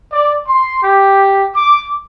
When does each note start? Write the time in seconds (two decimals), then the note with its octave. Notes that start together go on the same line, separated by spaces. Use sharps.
0.12 D5
0.47 C6
0.83 G4
1.55 D6